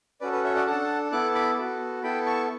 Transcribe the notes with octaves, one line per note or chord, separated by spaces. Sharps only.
C#4 F#4 A4 B4 D5
B4
C#5 E5
D5 F#5
D4 A4 F#5 A5
B3 E4 A4 D6 F#6
B5 D6
B3 F#4 A4
B3 E4 A4 G5 B5
A5 C#6